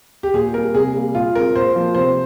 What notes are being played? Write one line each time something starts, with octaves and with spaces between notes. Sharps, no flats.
G4
A#2 G#4
G3 A#3 A#4
C3 G#4
G3 A#3
A#2 F4
G#3 C4 A#4
A#2 C5
F3 A#3
C3 C5